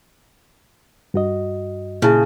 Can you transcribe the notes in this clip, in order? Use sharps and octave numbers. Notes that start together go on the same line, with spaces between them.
G2 F#4 D#5
A#2 C#3 E4 A5